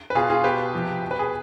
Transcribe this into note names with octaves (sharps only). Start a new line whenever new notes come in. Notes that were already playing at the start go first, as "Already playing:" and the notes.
B4
B2 F4 G#4
F4 G#4
B2 G4 B4
C3 F3
B2
B4
G#4